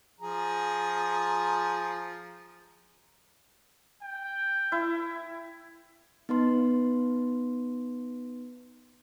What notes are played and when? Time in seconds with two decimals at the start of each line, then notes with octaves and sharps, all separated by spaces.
0.20 F3 G#4 A#5
4.02 G5
4.72 E4
6.29 B3 D#4 B4 C6